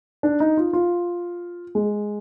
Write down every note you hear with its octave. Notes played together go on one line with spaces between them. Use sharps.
D4
D#4
F4
F4
G#3